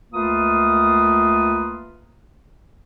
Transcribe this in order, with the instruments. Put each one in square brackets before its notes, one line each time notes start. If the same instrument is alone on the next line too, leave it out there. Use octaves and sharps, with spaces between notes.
[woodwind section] C#2 A3 A#3 F4 B4 D#6